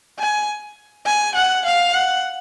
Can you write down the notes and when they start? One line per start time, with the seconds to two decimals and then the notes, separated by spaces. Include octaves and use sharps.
0.19 G#5
1.06 G#5
1.35 F#5
1.65 F5
1.93 F#5